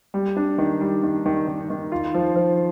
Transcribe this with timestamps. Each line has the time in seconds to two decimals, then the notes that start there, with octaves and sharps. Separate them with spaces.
0.14 G3
0.36 D4
0.58 D#3
0.81 G3
1.03 D#3
1.26 D#3
1.47 D#3
1.70 D#3
1.92 F4
2.14 F3
2.36 F3